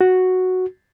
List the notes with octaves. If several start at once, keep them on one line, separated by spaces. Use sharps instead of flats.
F#4